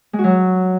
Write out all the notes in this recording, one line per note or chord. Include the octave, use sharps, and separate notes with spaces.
G#3
F#4
F#3